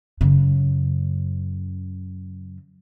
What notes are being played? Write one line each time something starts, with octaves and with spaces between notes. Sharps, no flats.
F#2 C#3